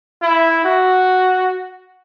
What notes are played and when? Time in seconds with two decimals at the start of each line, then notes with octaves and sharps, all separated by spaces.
0.22 E4
0.64 F#4